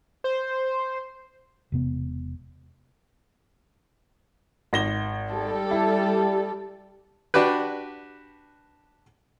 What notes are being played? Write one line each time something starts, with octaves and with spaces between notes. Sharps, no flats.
C5
E1 C3 B3
G#1 A#6 G7
G3 A4
E4
D4 F#4 G4 B4